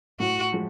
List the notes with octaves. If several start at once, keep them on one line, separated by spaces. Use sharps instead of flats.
A2 F#4
F3 G#3